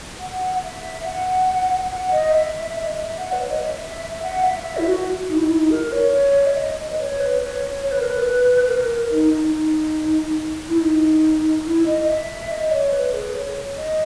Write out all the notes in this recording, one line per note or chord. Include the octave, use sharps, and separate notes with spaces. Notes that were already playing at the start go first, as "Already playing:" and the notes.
F#5
E5
F#5
F#5
D#5
E5
E5
D#5
E5
F#5
B4
C#5
D#5
E5
E5
E5
F#5
E5
E4
F#4
D#4
E4
D#4
E4
D#4
A#4
C#5
E5
D#5
B4
C#5
B4
C#5
C#5
B4
A#4
B4
A#4
D#4
D#4
D#4
E4
D#4
E4
D#5
E5
D#5
C#5
B4
G#4
C#5
D#5